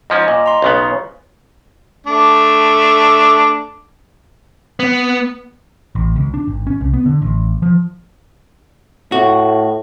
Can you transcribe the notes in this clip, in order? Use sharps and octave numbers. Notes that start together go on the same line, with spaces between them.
G#2 F3 C#4 D#5
A#2 D#5
A#5 C6
B1 C#3 B3
A3 D4
B3
A1
C#2
D4
G#1
C#4
C2
B3
D3
A1
F3
A2 F#4